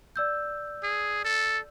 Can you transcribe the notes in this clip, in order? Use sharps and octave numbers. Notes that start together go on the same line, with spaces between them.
D5 E6 G6
G#4
A4